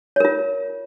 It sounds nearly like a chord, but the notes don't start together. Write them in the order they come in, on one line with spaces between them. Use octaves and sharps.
C#5 A#4 F4